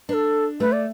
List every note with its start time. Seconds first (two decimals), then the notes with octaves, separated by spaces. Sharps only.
0.09 D4 B4
0.14 A4
0.60 A3 B4
0.72 D5